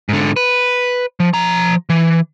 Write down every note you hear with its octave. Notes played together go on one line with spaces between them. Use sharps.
G#2 D3
B4
F3
F3 A#5
E3